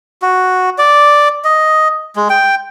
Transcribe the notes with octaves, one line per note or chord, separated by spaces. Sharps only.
F#4
D5
D#5
G#3
G5